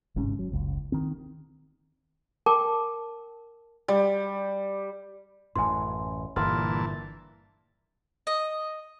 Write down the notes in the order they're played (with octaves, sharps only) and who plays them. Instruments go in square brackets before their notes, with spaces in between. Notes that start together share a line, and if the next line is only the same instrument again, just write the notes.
[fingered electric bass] G1 G#2 C3 C#4
F#3
F#1 C#2
D#3 C4
[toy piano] A#4 G5 A5 D6
[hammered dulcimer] G3
[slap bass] A1 F#2 A2 [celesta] G#5 C6
[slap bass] G1 G2 [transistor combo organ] A#2 E3 A5 [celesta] C6 F6
[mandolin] D#5